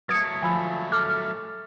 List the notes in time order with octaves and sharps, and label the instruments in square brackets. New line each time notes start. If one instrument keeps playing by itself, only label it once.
[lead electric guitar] F#3 A3 [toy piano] B4 D#6 [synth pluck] G#6 C#7
[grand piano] F3 [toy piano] G#5 B5 E6
[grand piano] A4 [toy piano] D6 [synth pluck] F6